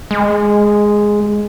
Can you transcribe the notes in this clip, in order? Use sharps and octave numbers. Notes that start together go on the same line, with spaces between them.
G#3